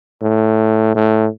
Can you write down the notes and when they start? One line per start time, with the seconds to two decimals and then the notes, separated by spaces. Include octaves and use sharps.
0.22 A2
0.95 A2